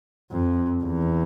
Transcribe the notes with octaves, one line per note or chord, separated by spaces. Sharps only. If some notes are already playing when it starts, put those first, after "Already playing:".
F2
E2